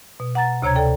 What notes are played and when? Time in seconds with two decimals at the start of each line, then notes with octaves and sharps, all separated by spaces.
0.20 B2
0.35 F#5 A#5 A6
0.62 D2 C3 C#5 A#5 G#6
0.75 A4 D5 G5